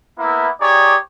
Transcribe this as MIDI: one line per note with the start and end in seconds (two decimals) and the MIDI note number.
0.19 0.49 58
0.19 0.49 59
0.19 0.49 64
0.61 0.96 63
0.61 0.96 67
0.61 0.96 68
0.61 0.96 73
0.61 0.96 74